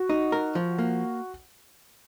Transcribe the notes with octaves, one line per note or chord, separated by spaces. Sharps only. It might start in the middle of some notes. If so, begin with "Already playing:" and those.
Already playing: F#4
D#4
A#4
F3
A#3